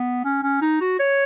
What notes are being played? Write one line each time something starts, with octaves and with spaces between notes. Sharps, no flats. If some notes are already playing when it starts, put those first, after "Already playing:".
Already playing: B3
C#4
C#4
D#4
F#4
C#5